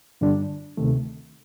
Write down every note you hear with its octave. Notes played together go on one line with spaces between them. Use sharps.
G2 D3 G3 D4
D2 C3 D#3 A3